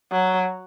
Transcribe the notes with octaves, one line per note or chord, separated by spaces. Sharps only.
F#3